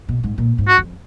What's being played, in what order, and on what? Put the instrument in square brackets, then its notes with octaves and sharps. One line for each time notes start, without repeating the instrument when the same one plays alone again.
[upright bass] B2
G#2
A#2
G#2
[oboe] F#4
[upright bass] F2